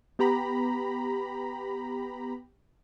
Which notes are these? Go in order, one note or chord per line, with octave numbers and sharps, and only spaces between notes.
B3 G4 A#5 B5